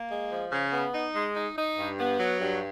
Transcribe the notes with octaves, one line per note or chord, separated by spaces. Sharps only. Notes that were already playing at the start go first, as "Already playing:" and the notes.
Already playing: A#3
G#3
F3
C#3
B3
D#4
G#3
D#4
D#4
G2
B3
F#3
G2